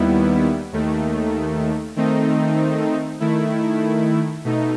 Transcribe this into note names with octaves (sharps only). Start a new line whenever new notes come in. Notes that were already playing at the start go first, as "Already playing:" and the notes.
Already playing: D#2 D#3 G3 B3 E4
D#2 D#3 A3
D#3 A3 C4 D#4
D#3 A3 E4
B2 A3 D#4